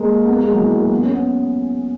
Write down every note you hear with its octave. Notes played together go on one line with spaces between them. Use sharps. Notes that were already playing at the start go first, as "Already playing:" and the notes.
Already playing: G#3 A#3
B3
A#3
G#3
F#3
E3
F#3
A#3
B3
C#4
B3